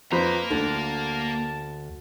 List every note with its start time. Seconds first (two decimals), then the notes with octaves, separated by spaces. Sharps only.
0.12 F2 A#3 B4 C5 A#5 B5
0.50 D2 D3 A5